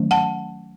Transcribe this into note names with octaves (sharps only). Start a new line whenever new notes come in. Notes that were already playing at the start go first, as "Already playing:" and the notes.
Already playing: D#3 F#3 A3 C#4
F#5 A5